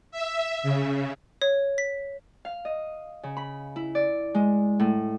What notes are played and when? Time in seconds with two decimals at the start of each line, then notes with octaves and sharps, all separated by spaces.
0.11 E5
0.63 C#3
1.42 C#5
1.78 B6
2.45 F5
2.65 D#5
3.23 C#3
3.37 B5
3.76 E4
3.95 D5
4.35 G#3
4.80 A2